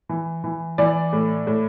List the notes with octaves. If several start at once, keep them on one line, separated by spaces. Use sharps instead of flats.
E3
E3
E3 D5
A2
A2